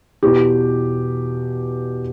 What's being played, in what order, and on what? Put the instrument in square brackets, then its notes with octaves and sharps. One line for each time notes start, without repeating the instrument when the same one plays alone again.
[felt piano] E2 B2 G4